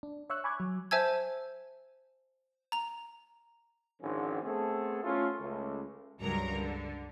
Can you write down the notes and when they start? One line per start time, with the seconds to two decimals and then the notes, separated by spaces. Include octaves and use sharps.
0.03 D4
0.30 C#5 E5 C#6 E6 F#6
0.44 G#5 B5 C#6 D6 F#6 G#6
0.60 F#3
0.91 C5 E5 G#5 A5 E6 G#6
2.72 A#5 F7
4.01 G#1 G#2 D3 F3 C4 C#4
4.42 A3 B3 C4 G#4 A4
5.03 A3 C#4 E4 F4
5.39 C#2 A3
6.21 C#2 G2 F#3 A#4 A#5
6.54 D3